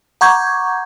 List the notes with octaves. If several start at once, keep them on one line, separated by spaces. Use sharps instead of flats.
F#5 A#5 C#6 D6 G6 G#6